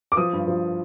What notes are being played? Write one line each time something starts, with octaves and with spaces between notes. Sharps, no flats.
D6
F3 D#6
G2
F3